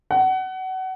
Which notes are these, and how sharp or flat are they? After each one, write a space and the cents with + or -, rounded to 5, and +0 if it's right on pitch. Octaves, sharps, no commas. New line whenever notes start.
F#5 +25